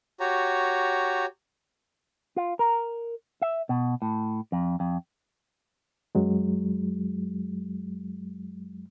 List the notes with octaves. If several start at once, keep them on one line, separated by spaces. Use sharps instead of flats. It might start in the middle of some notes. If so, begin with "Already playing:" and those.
F#4 G4 C#5 A#5
F4
A#4
E5
B2
A2
F2
F2
F#2 F#3 G#3